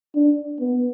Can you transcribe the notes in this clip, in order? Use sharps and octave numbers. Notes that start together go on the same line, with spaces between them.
D4
B3